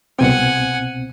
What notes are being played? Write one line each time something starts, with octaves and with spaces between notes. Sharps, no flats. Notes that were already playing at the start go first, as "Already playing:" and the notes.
C2 B2 C4 F#5 G#5